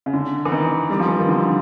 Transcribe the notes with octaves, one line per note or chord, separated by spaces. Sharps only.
C#3
D3
E3
D#3
G3
F3
E3
D#3
D3